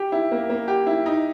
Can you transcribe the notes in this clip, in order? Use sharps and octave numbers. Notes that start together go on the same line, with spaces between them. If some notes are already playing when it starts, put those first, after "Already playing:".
Already playing: G4
E4
A#3
A#3
G4
E4
D#4